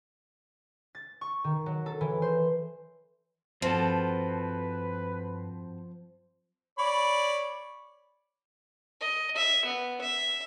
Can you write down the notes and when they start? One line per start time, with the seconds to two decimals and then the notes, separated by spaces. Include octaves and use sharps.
0.95 A6
1.21 C#6
1.44 D#3
1.66 F#3
1.86 A4
2.01 E3
2.22 C5
3.62 G2 F3 C4 F#4 A4 B4
6.78 C#5 D5 B5
9.01 D#5
9.36 E5
9.65 B3
10.01 E5